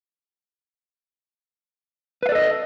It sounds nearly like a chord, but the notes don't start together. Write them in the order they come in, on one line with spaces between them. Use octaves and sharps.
B4 F5 D5 A4 D#5